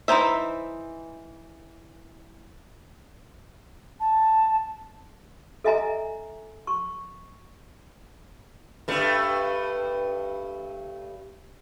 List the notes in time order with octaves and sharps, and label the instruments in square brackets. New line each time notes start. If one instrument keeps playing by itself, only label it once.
[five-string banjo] E3 F#3 D#4 C5 E5
[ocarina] A5
[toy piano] A4 D#5 E5 G#5 A#5
C#6
[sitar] G2 A3